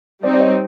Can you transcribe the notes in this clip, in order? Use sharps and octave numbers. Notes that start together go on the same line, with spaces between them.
G3 C4 D#4 C5 D5
D5
C#5 D#5